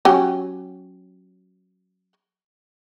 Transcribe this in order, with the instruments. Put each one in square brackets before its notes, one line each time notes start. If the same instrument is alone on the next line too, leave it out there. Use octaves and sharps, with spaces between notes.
[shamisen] F#3 C#4 G4